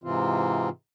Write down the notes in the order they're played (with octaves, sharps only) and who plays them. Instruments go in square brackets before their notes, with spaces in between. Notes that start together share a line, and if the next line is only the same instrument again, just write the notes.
[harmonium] G#2 C3 E3 C4 F4